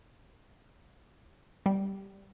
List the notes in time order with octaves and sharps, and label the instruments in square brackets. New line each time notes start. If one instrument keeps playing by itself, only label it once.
[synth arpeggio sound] G3